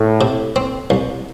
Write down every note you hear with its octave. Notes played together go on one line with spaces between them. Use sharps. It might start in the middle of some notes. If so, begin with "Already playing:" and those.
Already playing: A2
C3
C4
C2